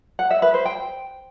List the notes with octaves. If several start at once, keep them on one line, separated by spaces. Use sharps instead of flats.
F#5
E5
B4
C5
G5